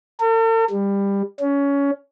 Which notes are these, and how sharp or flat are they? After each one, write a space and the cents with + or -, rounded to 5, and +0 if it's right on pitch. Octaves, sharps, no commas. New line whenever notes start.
A4 +45
G3 +20
C#4 +20